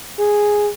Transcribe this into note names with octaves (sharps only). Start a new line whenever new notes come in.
G#4